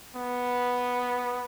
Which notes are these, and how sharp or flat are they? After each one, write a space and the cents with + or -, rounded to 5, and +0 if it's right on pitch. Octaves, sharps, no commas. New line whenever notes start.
B3 -5